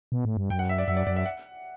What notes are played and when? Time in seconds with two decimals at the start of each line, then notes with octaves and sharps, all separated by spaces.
0.12 B2
0.25 A2
0.37 G2
0.50 F#2 G5
0.59 F#5
0.69 E5
0.78 D5
0.88 F#2 E5
0.97 D5
1.07 F#2 D5
1.16 E5
1.26 F#5